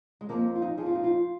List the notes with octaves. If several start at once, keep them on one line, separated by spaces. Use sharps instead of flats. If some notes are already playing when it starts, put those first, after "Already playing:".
G#3
F2 F3 A#3
F4
D#4
F2 F3 G#4
F4
D#4
F4